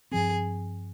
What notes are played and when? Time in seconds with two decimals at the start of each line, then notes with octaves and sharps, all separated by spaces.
0.12 G2 F3 C4 G#4